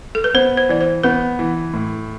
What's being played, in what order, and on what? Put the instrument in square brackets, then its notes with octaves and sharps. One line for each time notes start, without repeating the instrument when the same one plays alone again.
[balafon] A4
B4
[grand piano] B3 [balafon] C5
[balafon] C5
[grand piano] E3 [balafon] D5
[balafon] C5
[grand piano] B3 [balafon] B4
[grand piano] E3
A2